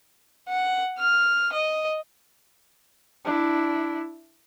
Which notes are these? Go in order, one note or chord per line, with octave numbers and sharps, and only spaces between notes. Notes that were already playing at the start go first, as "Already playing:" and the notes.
F#5
F6
D#5
D4 E4